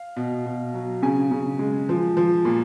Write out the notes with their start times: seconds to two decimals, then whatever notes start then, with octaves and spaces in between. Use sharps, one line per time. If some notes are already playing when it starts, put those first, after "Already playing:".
Already playing: F5
0.16 B2
0.46 B2
0.74 F#3
1.03 C#3 G#5
1.31 C#3
1.59 G#3
1.89 F3
2.17 F3
2.45 A#2